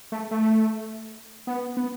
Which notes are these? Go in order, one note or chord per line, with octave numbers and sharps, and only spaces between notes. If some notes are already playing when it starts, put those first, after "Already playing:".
A3
A3
B3
B3